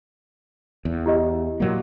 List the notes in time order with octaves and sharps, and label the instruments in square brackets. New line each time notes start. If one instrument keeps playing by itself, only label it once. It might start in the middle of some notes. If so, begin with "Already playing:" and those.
[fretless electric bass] E2
[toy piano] E4 G4 D#5
[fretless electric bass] A#2 F#3 A#3